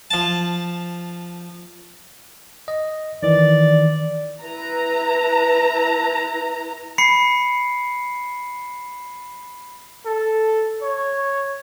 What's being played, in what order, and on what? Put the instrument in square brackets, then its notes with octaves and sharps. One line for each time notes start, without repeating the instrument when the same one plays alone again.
[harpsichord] F3 A5
[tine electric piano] D#5
[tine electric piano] D#3 E3 [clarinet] D5
[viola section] E4 B4 A#5
[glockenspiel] B5 C7 C#7
[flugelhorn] A4
C#5